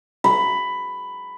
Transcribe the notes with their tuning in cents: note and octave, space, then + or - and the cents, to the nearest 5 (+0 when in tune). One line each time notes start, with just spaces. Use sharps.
B5 +10